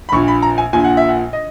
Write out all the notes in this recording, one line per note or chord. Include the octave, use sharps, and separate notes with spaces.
B5
A#1 A#2 C#6
B5
A#5
G#5
A#1 A#2 G#5
F#5
E5
F#5
D#5